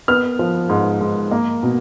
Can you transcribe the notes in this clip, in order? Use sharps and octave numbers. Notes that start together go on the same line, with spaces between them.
B3 F6
F3
G#2
G#2
A#3
B2